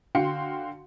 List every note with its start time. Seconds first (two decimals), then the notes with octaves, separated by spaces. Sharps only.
0.15 D3 F#4 F5 G5 C6 C#7